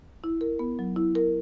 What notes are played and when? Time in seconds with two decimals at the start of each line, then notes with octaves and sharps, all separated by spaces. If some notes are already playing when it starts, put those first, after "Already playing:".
0.24 E4
0.41 A#4
0.59 B3
0.79 F#3
0.96 E4
1.15 A#4